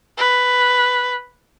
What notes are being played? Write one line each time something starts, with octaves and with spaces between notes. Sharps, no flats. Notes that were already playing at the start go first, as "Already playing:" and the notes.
B4